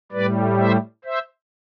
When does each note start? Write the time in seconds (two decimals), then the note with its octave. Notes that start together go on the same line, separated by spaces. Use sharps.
0.12 A2 G3 B4 D5
0.58 C5 E5
1.04 C5 E5